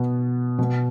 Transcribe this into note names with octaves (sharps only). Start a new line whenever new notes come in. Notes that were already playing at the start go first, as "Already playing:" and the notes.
Already playing: B2 B3
B2 B3